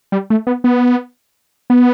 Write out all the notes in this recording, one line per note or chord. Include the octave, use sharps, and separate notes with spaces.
G3
A3
B3
B3
B3